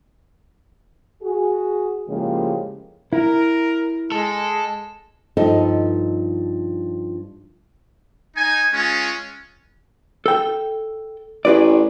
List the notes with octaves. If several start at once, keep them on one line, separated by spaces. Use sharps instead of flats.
F#4 G#4
A2 C#3 F3 G#3 A#3 G4
E4 A#4
G#3 A4
G2 F3 D#4 A4 D#5
D#4 G#5
G#3 C#4 F4 G#5
A4 G5
A1 G#4 B4 D5